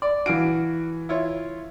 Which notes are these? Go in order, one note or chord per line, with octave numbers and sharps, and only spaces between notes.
D5
E3 F#4 F5 D7
E4 F4 C#5